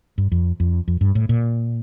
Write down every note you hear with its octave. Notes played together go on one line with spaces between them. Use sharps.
G2
F2
F2
F2
G2
A2
A#2